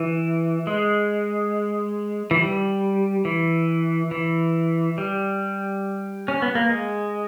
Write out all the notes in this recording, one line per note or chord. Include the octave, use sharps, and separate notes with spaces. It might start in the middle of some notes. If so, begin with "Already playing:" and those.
Already playing: E3
G#3
E3
G3
E3
E3
G3
C#4
B3
A#3
G#3